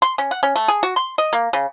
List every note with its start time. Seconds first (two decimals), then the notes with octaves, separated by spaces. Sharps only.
0.02 C6
0.18 C#4
0.31 F#5
0.43 C#4
0.56 A3
0.68 G#4
0.83 F#4
0.96 C6
1.18 D#5
1.33 A#3
1.53 C#3